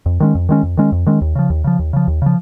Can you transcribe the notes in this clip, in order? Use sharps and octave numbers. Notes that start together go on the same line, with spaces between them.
F2
D#3 G#3 C#4
F2
D#3 G#3 C#4
F2
D#3 G#3 C#4
F2
D#3 G#3 C#4
D#2
C#3 F3
D#2
C#3 F3
D#2
C#3 F3
D#2
C#3 F3